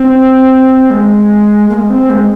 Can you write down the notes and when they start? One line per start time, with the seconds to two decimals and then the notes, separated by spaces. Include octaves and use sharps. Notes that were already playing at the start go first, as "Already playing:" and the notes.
Already playing: C4
0.90 G#3
1.70 A#3
1.74 G#3
1.90 C4
2.10 G#3